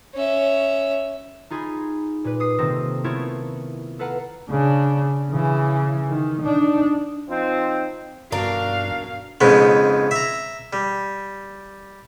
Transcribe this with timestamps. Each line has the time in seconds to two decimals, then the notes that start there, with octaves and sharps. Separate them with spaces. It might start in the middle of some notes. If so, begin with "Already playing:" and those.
0.15 C#4 E5
1.50 D#4 F4 G#4 A#5 B5
2.24 A#2 B4
2.40 D#6 C7
2.58 C3 D#3 A#3 C4 A4 A#6
3.04 A3 B3 E4 F4 A#4 C#5
3.99 A4 B4 F5 F#5 A#5 F6
4.50 C#3 D4
5.31 C#3 E3
6.09 D#3
6.41 D4 D#4
7.29 F3 C4 D#4 F4
8.32 G2 B2 D4 F#4 A#4 F5
9.41 F2 G#2 C#3 G#3 B3
10.11 E5 A#5
10.73 G3